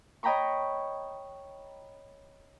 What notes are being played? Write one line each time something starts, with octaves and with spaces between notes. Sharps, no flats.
C#5 D#5 G5 A#5 B5 C#6